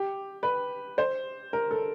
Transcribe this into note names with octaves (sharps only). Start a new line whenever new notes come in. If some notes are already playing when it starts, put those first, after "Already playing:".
Already playing: G4
B4
C5
A#4
A4